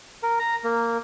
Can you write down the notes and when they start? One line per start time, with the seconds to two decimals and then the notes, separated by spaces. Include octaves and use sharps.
0.23 A#4
0.39 A#5
0.64 A#3